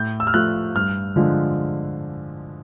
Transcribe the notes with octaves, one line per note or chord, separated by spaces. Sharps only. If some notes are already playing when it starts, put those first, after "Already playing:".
Already playing: A2 G6
E6
F6
F3 A3 F#6
G2 F6
D3 F3 G#3